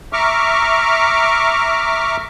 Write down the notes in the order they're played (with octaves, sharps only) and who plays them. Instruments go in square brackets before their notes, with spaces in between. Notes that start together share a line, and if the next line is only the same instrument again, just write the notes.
[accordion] E5 A#5 C#6 D6 F6